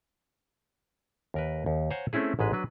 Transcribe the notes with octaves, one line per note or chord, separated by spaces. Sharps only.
D#2 A#4 B4
D#2
C5 C#5 F5 F#5 G#5 A#5
A3 C4 C#4 E4 G#4
A1 G#2 G#3 B4
F#3 D4 B4